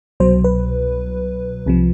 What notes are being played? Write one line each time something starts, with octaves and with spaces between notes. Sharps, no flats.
C2 B2 F#3 C5
B4
C2 C3 F3